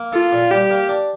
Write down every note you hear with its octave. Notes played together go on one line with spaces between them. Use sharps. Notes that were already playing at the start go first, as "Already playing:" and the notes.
Already playing: A#3
F4 A4
A#2
G3 G4
A#3
D4